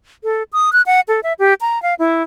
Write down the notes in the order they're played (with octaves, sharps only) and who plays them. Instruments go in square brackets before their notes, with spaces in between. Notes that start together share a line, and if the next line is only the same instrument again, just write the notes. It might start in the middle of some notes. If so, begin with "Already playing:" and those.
[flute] A4
D#6
F#6
F#5
A4
E5
G4
A#5
F5
E4